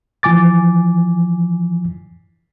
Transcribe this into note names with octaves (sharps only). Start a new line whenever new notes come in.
E3 F3 G#5 D6 A6